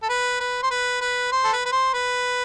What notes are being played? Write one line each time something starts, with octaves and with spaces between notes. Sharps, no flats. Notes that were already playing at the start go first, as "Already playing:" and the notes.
A4
B4
B4
C5
B4
B4
C5
A4
B4
B4
C5
B4